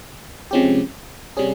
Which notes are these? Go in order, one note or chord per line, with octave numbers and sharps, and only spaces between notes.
C3 F3 G#3 C#4 G4
C3 G3 C#4 G#4